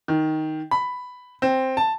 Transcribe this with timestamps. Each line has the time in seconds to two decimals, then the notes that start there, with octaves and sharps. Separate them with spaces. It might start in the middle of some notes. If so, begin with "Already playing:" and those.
0.08 D#3
0.71 B5
1.42 C4
1.77 A5